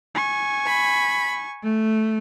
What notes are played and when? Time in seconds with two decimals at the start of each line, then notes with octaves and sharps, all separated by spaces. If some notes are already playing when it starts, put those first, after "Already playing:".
0.15 G#5 C#6
0.66 B5
1.63 A3